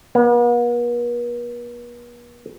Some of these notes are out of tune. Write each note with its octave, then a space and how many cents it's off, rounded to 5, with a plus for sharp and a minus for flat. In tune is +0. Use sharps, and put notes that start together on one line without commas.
B3 -45